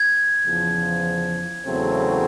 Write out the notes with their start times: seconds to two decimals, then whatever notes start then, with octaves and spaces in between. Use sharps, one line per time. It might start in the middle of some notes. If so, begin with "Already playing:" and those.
Already playing: G#6
0.45 E2 C#3 F3
1.65 E2 C#3 F#3 A3 C4